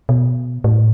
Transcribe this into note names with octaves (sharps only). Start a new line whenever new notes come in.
B2
A2